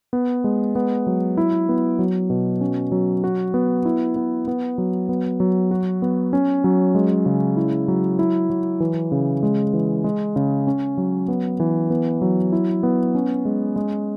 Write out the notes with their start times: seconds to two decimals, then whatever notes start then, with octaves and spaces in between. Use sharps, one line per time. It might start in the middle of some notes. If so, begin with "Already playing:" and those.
0.13 B3
0.44 G#3
0.75 B3
1.07 F#3
1.37 E4
1.69 B3
1.99 F#3
2.30 B2
2.61 C#4
2.92 F#3
3.24 F#4
3.54 B3
3.85 E4
4.16 B3
4.48 B3
4.78 F#3
5.09 B3
5.40 F#3
5.71 F#4
6.02 B3
6.33 C#4
6.64 F#3
6.95 G#3
7.26 C#3
7.57 E4
7.88 F#3
8.19 E4
8.50 F#3
8.80 E3
9.12 C#3
9.43 G#3
9.74 E3
10.04 G#3
10.36 C#3
10.67 C#4
10.98 F#3
11.28 B3
11.60 E3
11.90 B3
12.22 F#3
12.52 E4
12.83 B3
13.15 C#4
13.45 G#3
13.76 G#3